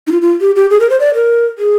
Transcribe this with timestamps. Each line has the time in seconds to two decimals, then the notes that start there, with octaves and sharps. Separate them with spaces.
0.07 D#4
0.12 F4
0.22 F4
0.41 G4
0.56 G4
0.70 G#4
0.80 A#4
0.90 C5
1.00 D5
1.15 A#4
1.58 G#4